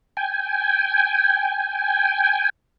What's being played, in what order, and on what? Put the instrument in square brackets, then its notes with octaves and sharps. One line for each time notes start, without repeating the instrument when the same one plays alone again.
[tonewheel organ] G5 G#5